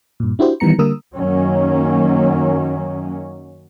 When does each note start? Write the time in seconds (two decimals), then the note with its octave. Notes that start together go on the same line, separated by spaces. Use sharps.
0.20 G2 A#2
0.39 D4 E4 F#4 G4 C5
0.60 D#3 E3 G3 B3 A#5 C#7
0.78 D3 G3 A#3 A#4 D#6 E6
1.15 F#2 D#3 F#3 A#3 C#4